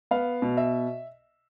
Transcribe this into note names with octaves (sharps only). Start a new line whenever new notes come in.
B3 F5
B2
E5